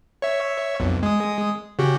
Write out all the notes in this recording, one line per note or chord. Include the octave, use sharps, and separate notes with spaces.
C#5 E5
B1 F2
G#3 D#6
C#3 F#4 G4